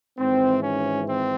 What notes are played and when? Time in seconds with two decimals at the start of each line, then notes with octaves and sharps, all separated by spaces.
0.17 G#1 G#2 E3 C4
0.62 C#4
1.06 C4